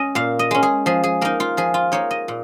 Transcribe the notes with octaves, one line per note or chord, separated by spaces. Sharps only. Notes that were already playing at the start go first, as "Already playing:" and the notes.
Already playing: C#4 D#5
A#2 F5
D#5
G#3 C#4
G#4
F3 G#4
G#4
A#3 D#4 A#4
F4
F3 G#4
F4
A#3 D#4 C#5
D#5
A#2